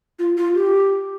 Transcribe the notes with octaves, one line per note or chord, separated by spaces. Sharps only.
F4
F4
G4